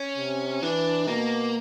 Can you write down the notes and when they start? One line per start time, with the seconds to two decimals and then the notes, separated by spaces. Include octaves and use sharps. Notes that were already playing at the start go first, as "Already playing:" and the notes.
Already playing: C#4
0.17 C3
0.62 E3 D4
1.08 B2 A#3